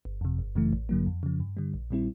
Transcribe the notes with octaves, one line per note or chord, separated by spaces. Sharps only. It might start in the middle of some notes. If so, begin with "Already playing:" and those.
G1
F2 C3
G1
F#2 C#3 E3 A3
A1
G2 D3 F#3 A#3
F2
C#3 F3
G2
D3 G3
A#1
A#2 G3 C4 E4